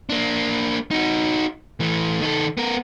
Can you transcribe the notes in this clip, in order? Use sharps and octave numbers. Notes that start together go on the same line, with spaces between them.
A#3 D4
D#4 F#4
E3 A3
D#3 A4
B3 A#4